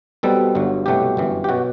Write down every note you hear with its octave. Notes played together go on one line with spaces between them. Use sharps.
B1 B2 G3 C4 A4
G1 G2 F#3
C2 B2 F#3 A3 G4
G1 F#2 E3
G4
B2 F#3 F#4